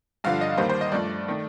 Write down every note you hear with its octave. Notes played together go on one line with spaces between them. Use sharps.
G2 D3 F3 F5
D#5
D#2 D#3 G3 A#3 C5
C5
D#5
G2 F3 A3 D5
D#3 A3